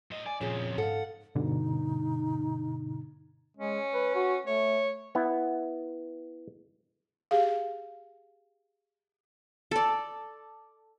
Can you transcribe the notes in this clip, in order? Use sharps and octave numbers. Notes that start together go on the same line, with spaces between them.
A2 D#5
D5 G#5
F2 A#2 C#3 C#4 G#4
G#2 A4 F5 F#5
G2 B2 D3 D#4
G#3 C#4
B4
F#4
A3 C#5
B3 E4
G4 G#4 F5
A4 D5